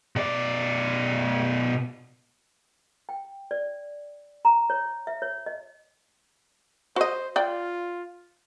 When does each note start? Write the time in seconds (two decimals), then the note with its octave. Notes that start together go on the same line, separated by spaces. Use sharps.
0.16 B2 D5
3.09 G5
3.51 D5
4.45 A#5
4.70 C#5
5.07 E5
5.22 C#5
5.46 D#5
6.96 F#4 C5 D#5
7.36 F4 D5 G5